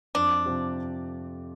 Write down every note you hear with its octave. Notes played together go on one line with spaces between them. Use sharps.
F2 D4
C3 F3 C4 G4